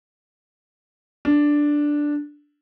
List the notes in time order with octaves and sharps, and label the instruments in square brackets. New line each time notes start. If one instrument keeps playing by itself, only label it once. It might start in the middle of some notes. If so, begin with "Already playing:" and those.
[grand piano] D4